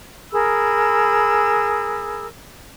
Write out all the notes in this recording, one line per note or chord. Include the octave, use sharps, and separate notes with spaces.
G#4 A#4 B5 E6